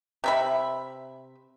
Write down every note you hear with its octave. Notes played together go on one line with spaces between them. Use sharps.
C3 E5 B5